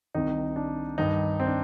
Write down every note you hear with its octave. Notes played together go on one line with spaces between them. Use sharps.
C2 C3 D#3 D#4
D4
G2 D#3 D#4
C4
D4